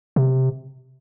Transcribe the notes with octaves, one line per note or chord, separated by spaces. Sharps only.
C3